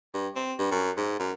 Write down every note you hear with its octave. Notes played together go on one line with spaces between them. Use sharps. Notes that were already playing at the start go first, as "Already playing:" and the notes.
G2
C4
G2
F#2
G#2
F#2